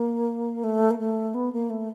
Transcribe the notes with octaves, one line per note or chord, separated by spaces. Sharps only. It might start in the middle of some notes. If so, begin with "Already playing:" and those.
Already playing: A#3
A3
A#3
A3
B3
A#3
A3